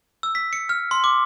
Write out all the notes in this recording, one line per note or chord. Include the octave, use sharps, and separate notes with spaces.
E6
B6
C#7
F6
C6
D6